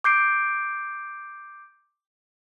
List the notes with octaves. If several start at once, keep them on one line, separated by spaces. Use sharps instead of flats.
D6 G6 C7 D7